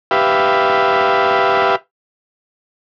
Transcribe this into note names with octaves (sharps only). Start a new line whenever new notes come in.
G4 B4 E5 F5